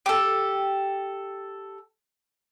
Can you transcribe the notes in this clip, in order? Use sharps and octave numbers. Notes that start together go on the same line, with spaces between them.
G4 A4